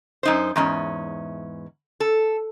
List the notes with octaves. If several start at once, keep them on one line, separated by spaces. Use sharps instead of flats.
F#2 D#4 C5
E2 G#2 C#4
A4